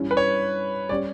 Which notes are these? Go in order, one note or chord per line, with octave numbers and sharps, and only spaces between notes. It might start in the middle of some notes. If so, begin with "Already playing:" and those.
Already playing: G2 E3 G3 C#4
B4
C#5
G3 C#4 G4 C#5 D5